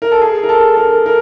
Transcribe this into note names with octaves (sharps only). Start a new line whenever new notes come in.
A#4
A4
G#4
A#4
A4
A#4
A#4